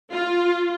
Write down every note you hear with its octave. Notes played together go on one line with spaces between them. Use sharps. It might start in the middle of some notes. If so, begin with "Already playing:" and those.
F4